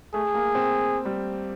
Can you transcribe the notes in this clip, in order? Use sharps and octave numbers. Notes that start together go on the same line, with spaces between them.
A3 G#4
A#3
C4
G3